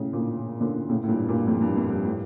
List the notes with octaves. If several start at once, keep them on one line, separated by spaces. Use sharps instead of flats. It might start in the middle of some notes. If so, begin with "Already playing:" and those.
Already playing: A2 C#3
A#2 D3
A#2 D3
A2 C#3
A2
G2 A#2
G2 A#2
F2 A2
G2
F2
G2
A2